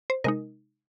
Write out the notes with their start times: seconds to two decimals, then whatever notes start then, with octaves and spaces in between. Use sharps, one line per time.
0.10 C5
0.24 C3 G#3 D#4 A#4 D#5